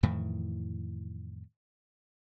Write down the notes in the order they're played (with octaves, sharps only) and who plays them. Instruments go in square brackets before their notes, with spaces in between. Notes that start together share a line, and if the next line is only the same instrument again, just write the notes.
[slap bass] F2 A2 D#3 E3